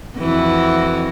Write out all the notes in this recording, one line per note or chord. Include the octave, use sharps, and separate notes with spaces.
F2 E3 F#4